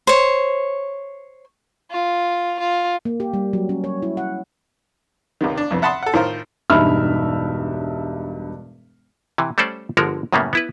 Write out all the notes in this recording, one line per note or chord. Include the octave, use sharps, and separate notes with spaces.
C5 C#5
F4
F4
A#3
G4
G3
F#3
C#4
C#5
E4
F#5
C#2 C3 D#3
D4
C2 F2 B3
E5 F#5 A5 B5 C6 D#6
A4 F#5
A2 D#3 F4 A#4 C5
E1 G2 D#4 E5 B5 F6
C3 E3
G3 A3 C#4 A4 C5 D5
G1 D3 F3 G#3 F#4 A#4
F#2 A2 C#3 G3 A#3 B3
B3 E4 B4